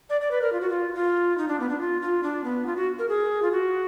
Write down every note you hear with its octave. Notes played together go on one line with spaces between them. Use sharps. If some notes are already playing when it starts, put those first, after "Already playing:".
D5
D5
B4
A#4
F4
F#4
F4
F4
D#4
D4
B3
D4
F4
F4
D4
B3
F4
F#4
A#4
G#4
F4
F#4